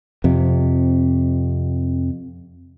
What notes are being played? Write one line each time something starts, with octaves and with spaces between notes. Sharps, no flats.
F2 C3